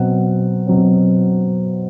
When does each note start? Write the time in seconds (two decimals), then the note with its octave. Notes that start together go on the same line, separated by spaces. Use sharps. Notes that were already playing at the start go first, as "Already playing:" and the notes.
Already playing: B2 F#3 C4 F#5
0.67 B2 F#3 C4